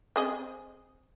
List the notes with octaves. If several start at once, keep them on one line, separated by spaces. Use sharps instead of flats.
C4 G#4 D#5